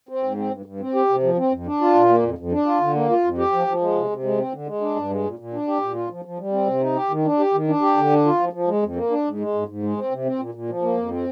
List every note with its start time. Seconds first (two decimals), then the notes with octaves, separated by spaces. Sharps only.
0.09 C4
0.23 G#2
0.37 C4
0.51 G2
0.66 G2
0.80 C4
0.95 G4
1.09 C3
1.23 F3
1.38 C4
1.52 F2
1.66 D4
1.81 F4
1.94 A#2
2.09 A#3
2.23 F2
2.38 F2
2.52 D4
2.66 F4
2.81 D3
2.95 A#3
3.10 F4
3.24 F2
3.38 G4
3.52 F3
3.67 F3
3.81 G#3
3.95 C3
4.10 C3
4.24 G#3
4.38 C4
4.52 D3
4.67 G#3
4.81 D4
4.96 G2
5.10 G#3
5.24 A#2
5.39 A#2
5.53 D4
5.68 G4
5.82 A#2
5.95 F4
6.10 F3
6.25 F3
6.39 G3
6.53 C4
6.67 C3
6.81 D#4
6.96 G4
7.10 D#3
7.25 D4
7.39 G4
7.54 D#3
7.68 D4
7.82 G4
7.97 D3
8.10 D4
8.25 F4
8.40 F3
8.53 F3
8.68 G#3
8.83 F2
8.96 A#3
9.11 D4
9.25 G#2
9.39 G#3
9.54 G#2
9.68 G#2
9.83 G#3
9.97 C4
10.11 C3
10.25 C4
10.39 A#2
10.54 A#2
10.69 F3
10.82 A#3
10.97 F2
11.11 C4